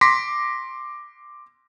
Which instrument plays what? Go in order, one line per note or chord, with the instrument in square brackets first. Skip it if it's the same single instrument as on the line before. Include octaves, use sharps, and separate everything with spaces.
[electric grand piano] C6 D6 A#6 B6